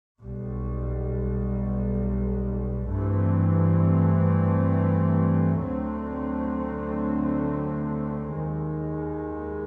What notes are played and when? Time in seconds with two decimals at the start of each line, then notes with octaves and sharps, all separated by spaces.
0.20 B1 B2 G3
2.90 G2 E3 A3 C4
5.60 D2 D3 F#3 A3 C4
8.30 D#2 D#3 G#3